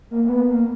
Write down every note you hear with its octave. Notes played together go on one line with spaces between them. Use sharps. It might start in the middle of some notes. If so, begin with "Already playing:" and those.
A#3
A#3
B3
A#3